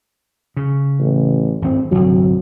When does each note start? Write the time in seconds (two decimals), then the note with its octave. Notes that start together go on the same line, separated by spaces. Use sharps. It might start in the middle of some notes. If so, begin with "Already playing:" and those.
0.57 C#3
0.99 A1
1.62 G#1 G2 C4
1.91 G1 C2 F#3